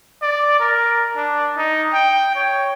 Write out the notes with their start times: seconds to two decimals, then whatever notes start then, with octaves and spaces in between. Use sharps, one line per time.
0.22 D5
0.60 A#4
1.16 D4
1.57 D#4
1.94 G5
2.35 C#5